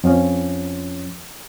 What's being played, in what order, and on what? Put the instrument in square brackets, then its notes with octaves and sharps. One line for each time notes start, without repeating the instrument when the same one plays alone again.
[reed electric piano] F2 F3 C#4